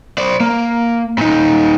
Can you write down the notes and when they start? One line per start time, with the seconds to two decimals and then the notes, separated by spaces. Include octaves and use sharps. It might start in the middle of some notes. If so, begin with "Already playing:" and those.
0.18 C5 D5
0.40 A#3
1.18 A#2 D#4